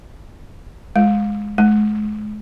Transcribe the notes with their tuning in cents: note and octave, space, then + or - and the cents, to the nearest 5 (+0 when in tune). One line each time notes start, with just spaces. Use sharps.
G#3 +0
G#3 +35